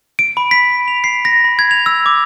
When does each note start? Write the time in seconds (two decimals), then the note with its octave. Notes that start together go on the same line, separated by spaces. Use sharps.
0.19 D7
0.37 B5
0.51 B6
0.88 F7
1.04 C7
1.25 A#6
1.44 B5
1.59 G#6
1.71 F7
1.86 E6
2.06 D6